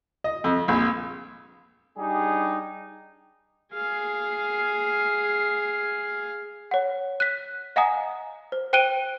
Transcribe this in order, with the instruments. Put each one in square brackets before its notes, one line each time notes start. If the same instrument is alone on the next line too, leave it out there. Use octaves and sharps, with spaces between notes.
[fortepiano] D#5
F2
A#1
[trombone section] G3 D4 D#4 G4 G#4
[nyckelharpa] G#4 F5
[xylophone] C#5 F#5
F#6 B6
D#5 F5 F#5 G#5 A#5 D#6
C5
C5 G5 F#6 D7 D#7 G7